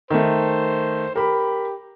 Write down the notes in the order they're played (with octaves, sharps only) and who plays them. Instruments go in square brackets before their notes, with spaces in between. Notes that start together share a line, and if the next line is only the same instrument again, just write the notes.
[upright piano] D#3 A3 [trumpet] C5
[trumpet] G4 [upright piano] A#4 B5